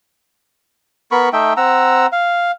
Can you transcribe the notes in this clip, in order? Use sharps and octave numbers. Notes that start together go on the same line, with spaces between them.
B3 A#4 B5 C#6
A3 D#4 E5 G5
C4 F#5 A#5 E6
F5